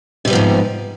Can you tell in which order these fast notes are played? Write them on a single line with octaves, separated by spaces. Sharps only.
C3 G3 B3 F3 G#2